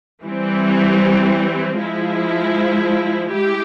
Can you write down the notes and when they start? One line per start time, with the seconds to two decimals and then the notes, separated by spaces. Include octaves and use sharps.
0.24 E3 G3 C4
1.78 F3 G#3 E4
3.32 G#3 E4 G4